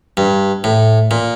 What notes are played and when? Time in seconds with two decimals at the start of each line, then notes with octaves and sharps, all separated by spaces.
0.17 G2
0.64 A2
1.11 A#2